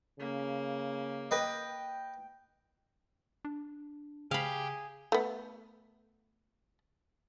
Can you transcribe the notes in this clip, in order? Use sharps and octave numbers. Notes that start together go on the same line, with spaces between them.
C#3 A#3
B4 D#5 G5
D4
C#3 G4 G#4 F5 B5
A3 B3